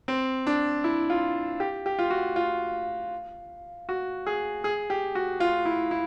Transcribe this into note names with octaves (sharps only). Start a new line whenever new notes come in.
C4
D4
E4
F4
G4
G4
F4
F#4
F4
F#4
G#4
G#4
G4
F#4
F4
E4
E4